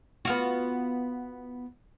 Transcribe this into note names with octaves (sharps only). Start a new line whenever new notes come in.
B3 F4 F#4